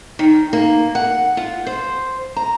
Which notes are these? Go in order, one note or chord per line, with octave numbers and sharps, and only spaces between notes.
D#3
A#3
F#5
F4
C5
A#5